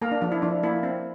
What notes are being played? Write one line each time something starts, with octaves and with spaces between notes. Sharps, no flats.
A#3 A#4
D4
F3 D4
E4
F3 D4
A#3 E4
C4